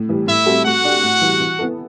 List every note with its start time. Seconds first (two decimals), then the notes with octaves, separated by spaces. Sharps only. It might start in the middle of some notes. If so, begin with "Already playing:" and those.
Already playing: A2
0.09 E3 G3
0.27 A2 E4 E5
0.46 G3 C4 F#4 A4
0.65 A3 F#4 F#5
0.84 D4 G4
1.02 A2
1.21 E3 G3
1.40 E3
1.59 B3 E4 A4